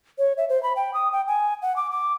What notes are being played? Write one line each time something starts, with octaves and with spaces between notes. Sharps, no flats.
C#5
E5
C5
B5
G5
D#6
G5
G#5
F#5
D6
D6